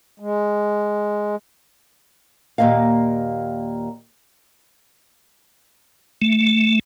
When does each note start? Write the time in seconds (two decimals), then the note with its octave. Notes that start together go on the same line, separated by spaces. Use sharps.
0.20 G#3
2.58 D#2 A#2 A#3 D#5 F5
6.22 A3